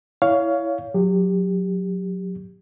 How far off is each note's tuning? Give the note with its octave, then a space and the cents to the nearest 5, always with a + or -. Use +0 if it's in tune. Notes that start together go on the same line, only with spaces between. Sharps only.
E4 +0 C#5 +25 F5 +0
F#3 -10 G4 +20